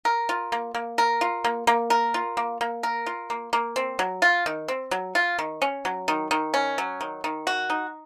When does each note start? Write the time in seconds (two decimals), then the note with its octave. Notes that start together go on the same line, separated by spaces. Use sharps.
0.05 A#4
0.29 F4
0.52 A#3
0.75 A#3
0.98 A#4
1.21 F4
1.44 A#3
1.67 A#3
1.90 A#4
2.14 F4
2.37 A#3
2.61 A#3
2.83 A#4
3.06 F4
3.30 A#3
3.53 A#3
3.76 C4
3.99 F#3
4.22 F4
4.46 D#3
4.68 C4
4.91 F#3
5.15 F4
5.39 D#3
5.62 C#4
5.85 F#3
6.08 D#3
6.31 D#3
6.54 C#4
6.78 F#3
7.01 D#3
7.24 D#3
7.47 F#4
7.70 D#4